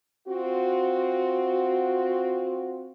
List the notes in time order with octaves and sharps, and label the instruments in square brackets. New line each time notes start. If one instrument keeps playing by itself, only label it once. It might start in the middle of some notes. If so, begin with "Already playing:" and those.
[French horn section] C4 F4 F#4